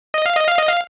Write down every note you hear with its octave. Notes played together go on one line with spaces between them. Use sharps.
D#5
F5
D#5
F5
D#5
F5